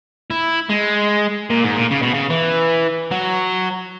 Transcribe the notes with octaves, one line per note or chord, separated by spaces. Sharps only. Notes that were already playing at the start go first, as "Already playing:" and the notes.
E4
G#3
A#2
G#2
A#2
C#3
B2
C#3
E3
F#3